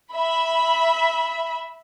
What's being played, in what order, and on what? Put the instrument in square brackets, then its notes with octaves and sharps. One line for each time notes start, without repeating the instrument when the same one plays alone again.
[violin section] E5 B5